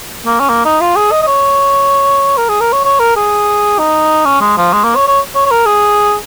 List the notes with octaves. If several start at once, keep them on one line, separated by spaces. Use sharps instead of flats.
A#3
C#4
A#3
D#4
F4
G#4
D#5
D#5
C#5
A#4
G#4
A#4
C#5
C#5
A#4
G#4
D#4
C#4
G#3
F3
G#3
A#3
C#5
C#5
C#5
C#5
A#4
G#4